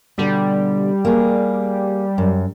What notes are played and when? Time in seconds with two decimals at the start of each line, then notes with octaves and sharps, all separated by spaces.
0.18 B2 D3 G3
1.05 A#3 G#4
2.18 F#2